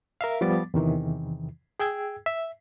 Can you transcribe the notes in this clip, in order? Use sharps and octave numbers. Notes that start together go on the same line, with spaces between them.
A#4 E5 F5
F3 G3 B3 D6 A6
E2 C3 D#3 E3
G#4 G5 E6 G#6
E5